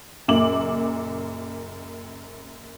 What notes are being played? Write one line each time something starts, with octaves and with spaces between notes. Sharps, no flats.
F#1 F#2 A#2 D6 F#7